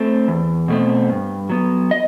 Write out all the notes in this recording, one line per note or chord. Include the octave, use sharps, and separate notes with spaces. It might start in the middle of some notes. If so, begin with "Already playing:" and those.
Already playing: A3 C4
E2
B2 A3 C4
G2
F#3 B3
D#5